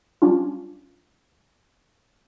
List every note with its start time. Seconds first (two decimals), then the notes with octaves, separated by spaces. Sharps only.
0.22 F#3 G3 C#4 D4 F4